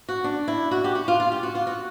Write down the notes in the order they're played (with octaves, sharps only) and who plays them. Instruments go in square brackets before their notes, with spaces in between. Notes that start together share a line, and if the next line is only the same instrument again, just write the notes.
[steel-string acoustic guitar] F#4
D4
E4
F#4
G4
F#4
F4
F4
G4
F#4
F4
F#4